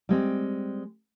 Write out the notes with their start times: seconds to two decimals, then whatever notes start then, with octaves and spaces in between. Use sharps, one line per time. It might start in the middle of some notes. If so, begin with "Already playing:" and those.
0.09 G3 G#3 C4